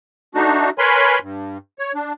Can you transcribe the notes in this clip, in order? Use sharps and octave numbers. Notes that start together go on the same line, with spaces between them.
A3 D4 D#4 F#4
A#4 B4 C#5 G#5 B5 C6
G2
C#5
D4